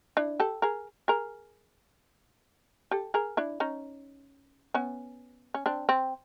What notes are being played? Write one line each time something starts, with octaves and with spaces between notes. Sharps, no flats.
D4 E4
G4 A4
G#4 A#4
G#4 A#4
G4 A4
G#4 A#4
D4 E4
C#4 D#4
B3 C#4
C#4
C4 D4
C4